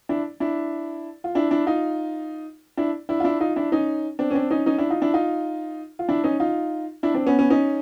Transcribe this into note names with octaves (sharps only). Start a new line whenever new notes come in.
D4 E4
D4 E4
F4
D4 E4
D4 E4
D#4 F4
D4 E4
D4 E4
F4
D4 E4
D#4 F4
D4 E4
C#4 D#4
C4 D4
C#4
C4 D4
C#4 D#4
C#4 D#4
D4 E4
D#4 F4
D4 E4
D#4 F4
F4
D4 E4
C#4 D#4
D#4 F4
D4 E4
C4 D4
B3 C#4
B3 C#4
C#4 D#4